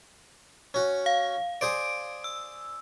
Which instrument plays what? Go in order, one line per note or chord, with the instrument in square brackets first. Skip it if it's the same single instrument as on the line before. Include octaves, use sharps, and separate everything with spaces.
[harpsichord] C#4 F#4
[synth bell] F5
[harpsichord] G#4 C5 D5 [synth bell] D7
[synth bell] E6